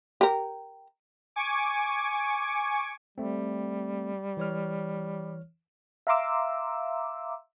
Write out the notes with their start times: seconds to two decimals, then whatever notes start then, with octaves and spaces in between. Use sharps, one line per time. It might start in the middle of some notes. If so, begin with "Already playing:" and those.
0.21 G4 A#4
1.36 G#5 C#6 D6
3.18 G3 A3 C4
4.37 E3 C#5 F6
6.07 E5 F5 A#5 C6 D6 E6